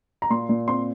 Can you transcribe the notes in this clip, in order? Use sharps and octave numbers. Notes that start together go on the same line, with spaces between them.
A#5
A#2 C6
A#2
C4 C6